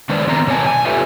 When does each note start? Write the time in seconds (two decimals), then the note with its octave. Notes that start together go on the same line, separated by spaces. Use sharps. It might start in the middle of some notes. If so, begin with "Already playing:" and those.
0.09 D#3 G#3 D4 B4 C5 D5
0.27 D#3 B3 C4 A#5
0.47 B2 C#5 D5 G#5 A5
0.67 G#5
0.85 F4 G4 A4 B4 C#5 E5